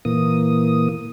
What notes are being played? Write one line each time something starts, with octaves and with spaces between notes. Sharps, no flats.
A#2 E3 A#3 D#6